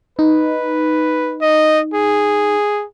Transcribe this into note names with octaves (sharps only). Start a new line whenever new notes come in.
D#4 B4
D#5
G#4